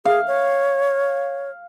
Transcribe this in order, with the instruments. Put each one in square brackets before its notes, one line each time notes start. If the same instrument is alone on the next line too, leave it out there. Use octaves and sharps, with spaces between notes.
[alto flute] G#4 [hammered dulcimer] F5
[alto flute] C#5